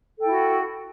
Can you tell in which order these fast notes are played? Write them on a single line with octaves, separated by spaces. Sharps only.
A4 G5 E4 F#4